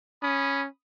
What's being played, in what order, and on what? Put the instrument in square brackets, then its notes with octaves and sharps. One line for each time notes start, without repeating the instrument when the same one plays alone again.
[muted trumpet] C#4 [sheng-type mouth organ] B5 D#6